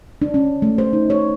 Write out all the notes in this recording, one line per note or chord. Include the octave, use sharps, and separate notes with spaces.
D4
C#4
A3
C5
D#4
C#5